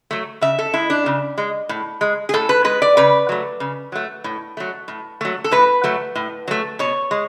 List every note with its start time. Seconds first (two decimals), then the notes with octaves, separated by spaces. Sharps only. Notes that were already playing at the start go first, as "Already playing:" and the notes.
0.11 F#3 A3
0.41 C#3 E5
0.59 A4
0.74 G#3 E4
0.90 D4
1.06 C#3
1.38 G#3
1.69 A2
2.01 G#3
2.29 G#4
2.34 A2 A4
2.49 B4
2.64 G#3 B4
2.82 D5
2.97 C#3 B4
3.29 F#3 A3
3.60 C#3
3.92 F#3 A3
4.24 A2
4.57 F#3 A3
4.88 A2
5.21 F#3 A3
5.44 A4
5.51 A2 B4
5.84 F#3 A3
6.15 A2
6.48 F#3 A3
6.79 B2 C#5
7.11 G#3